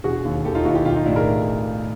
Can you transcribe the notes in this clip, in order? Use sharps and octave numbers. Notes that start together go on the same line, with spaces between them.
E1 F#4 G#4
D#2
D#2 G4 A4
D#4 F4
D#2 E4 F#4
F4 G4
B1 F4 G4
D#4 F4
A2 D4 E4
G#4 A#4